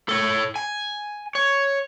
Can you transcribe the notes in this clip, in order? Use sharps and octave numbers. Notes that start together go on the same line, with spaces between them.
A4 C#5
G#5
C#5